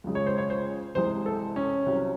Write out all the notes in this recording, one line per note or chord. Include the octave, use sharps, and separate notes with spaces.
C#2 C#3 G#3
C#5
C5
C#5
C5
C2 C3 E3 G#3 C5
A4
C#4
C2 C3 F#3